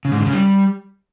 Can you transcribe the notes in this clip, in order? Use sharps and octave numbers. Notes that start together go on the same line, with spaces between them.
C#3
G#2
D3
C#3
G3